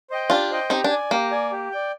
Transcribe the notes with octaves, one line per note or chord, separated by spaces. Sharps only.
C5 D#5 G5
D4 F4 G4
C5 D#5 G5
C4 D#4 G4
D4
D5 G#5
A#3 G4
D5 G#5
G4
D5 G5